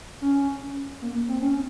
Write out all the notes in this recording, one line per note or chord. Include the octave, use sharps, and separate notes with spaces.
C#4
A#3
C4
C#4